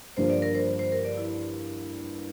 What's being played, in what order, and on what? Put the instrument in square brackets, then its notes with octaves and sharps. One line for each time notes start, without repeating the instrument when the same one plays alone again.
[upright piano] G2 D3 F3 A#3 F4 [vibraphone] C5
[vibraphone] D5
A#4
C5
C5
A#4
D5
E4